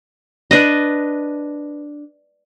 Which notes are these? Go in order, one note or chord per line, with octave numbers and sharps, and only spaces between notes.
D4 B4 D#5